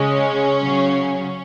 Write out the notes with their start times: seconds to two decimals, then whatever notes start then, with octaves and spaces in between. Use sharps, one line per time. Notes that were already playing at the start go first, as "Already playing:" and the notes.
Already playing: C#3 G#3 C#4
0.62 C#3 F#3